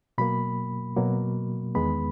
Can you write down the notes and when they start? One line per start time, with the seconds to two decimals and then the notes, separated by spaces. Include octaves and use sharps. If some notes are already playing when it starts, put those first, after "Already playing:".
0.18 B2 F#3 A#3 B5
0.96 B2 F#3 A#3
1.75 E2 D#3 G#3 B3 B5